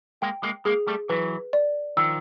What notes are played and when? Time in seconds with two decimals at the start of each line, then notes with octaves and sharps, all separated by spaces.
0.22 G#3 A#3 G5
0.43 G#3 A#3
0.65 G#3 A#3 G#4
0.87 G3 A3
1.09 E3 F#3 B4
1.53 D5
1.97 D#3 F3 E6